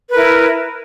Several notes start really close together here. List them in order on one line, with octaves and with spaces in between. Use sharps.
B4 A#4 E4